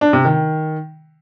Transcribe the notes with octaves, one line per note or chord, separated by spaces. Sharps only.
D4
C3
D#3